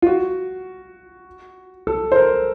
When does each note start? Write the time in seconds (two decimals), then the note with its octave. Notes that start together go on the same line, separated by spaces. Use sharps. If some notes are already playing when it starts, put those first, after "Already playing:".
0.02 F4
0.07 F#4
1.87 A4
2.12 C5
2.16 A#4